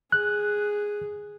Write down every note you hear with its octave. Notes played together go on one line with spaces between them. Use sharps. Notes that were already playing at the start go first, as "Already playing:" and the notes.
G#4 F#6